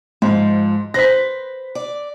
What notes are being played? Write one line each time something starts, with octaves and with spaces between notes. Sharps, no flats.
G#2 F3
B4 C5 A#6 B6
D5